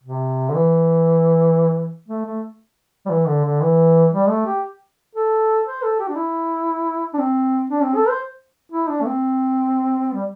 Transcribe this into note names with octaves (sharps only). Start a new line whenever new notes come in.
C3
D3
E3
A3
A3
G3
E3
D3
D3
E3
G3
A3
G4
A4
C5
A4
G4
D4
E4
D4
C4
D4
C4
A4
C5
E4
D4
A3
C4
G3